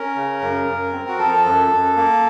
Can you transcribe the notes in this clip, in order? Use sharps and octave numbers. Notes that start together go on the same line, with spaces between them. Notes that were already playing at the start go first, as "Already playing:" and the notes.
Already playing: C#4 A#4
C#3
F#2
F#2
C4
F#4
F3 A4
F#2
F#2
A#3